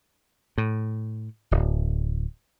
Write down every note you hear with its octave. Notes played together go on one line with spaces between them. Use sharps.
A2
D1